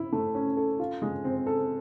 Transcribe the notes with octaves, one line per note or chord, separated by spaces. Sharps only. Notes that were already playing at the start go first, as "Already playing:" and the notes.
Already playing: E4
A3
C#4
A4
F4
G#3
C4
A4